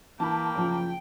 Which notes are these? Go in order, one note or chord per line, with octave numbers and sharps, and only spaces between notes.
E3 A#3 G5 A5 B5
F#1 F3